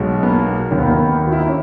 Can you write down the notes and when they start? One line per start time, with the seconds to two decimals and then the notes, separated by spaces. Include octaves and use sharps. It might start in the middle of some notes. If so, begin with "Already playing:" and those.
Already playing: B1 B2 G#3
0.23 B3
0.29 A#3
0.70 D#2 D#3 C#4
0.78 B3
0.85 A#3
0.92 B3
1.13 A#3
1.26 F#4
1.32 E4
1.41 D#4
1.47 C#4